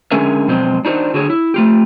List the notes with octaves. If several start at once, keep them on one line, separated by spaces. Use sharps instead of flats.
D3 G#3 C#4 G#4 A#4 E5
F2 B2 F#3 G#3 C4 C5
D4 D#4 F#4 B4 C5
D3 F#4 G#4 C#5
E4
A3 F4 G4